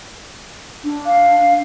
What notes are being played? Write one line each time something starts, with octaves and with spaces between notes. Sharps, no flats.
D4
F5